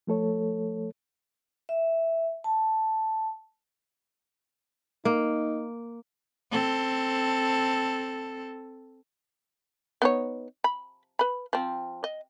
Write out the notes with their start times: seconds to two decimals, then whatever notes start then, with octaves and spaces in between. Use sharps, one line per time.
0.07 F3 A3 A4 C#5
1.69 E5
2.44 A5
5.05 A#3 D#4
6.51 C4 A4
10.02 B3 D#4 C#5
10.64 B5
11.19 B4 B5
11.53 F3 C4
12.04 D#5